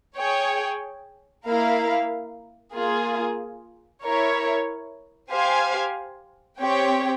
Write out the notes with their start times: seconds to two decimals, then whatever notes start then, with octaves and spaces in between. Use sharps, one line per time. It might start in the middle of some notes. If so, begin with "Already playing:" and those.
0.17 G#4 C#5 G5
1.46 A#3 E4 A#4 F5
2.74 A#3 F4 G#4
4.02 E4 A#4 C#5
5.31 G4 C5 F5 G#5
6.59 C4 G4 C#5 G5